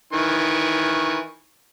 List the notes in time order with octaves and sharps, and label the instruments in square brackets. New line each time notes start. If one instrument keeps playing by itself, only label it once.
[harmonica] D#3 E3 C#6